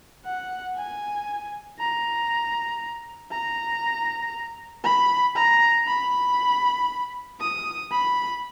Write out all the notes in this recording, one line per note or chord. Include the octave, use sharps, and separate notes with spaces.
F#5
G#5
A#5
A#5
B5
A#5
B5
D#6
B5